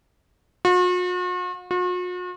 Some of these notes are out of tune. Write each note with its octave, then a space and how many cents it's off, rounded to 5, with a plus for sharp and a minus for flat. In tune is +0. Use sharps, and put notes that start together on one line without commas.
F#4 -45
F#4 -45